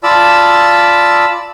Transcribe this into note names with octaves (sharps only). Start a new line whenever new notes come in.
F4 D5 A5 B5 E6